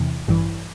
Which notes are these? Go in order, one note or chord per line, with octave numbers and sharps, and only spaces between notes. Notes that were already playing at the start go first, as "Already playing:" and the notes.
Already playing: E2 C3 E3
A1 G2 E3